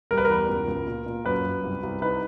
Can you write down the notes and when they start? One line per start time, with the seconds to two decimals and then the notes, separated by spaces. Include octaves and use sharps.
0.11 G3 A#4
0.18 B4
0.25 E2 A#4
0.49 C#2
0.68 C#2
0.87 A#2
1.06 A#2
1.25 F#2 B4
1.45 F#2
1.63 C2
1.83 C2
2.02 D#4 B4